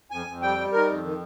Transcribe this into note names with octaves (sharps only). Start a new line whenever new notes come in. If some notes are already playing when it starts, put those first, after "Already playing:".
F2 G#5
F2
G3 G5
G3
D#3 A#4
F2
D#3